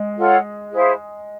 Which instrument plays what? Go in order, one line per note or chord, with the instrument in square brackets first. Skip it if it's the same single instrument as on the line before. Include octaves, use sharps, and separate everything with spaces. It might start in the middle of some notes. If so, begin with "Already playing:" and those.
Already playing: [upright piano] G#3
[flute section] F4 A4 C#5 F#5
E4 G#4 C5 F5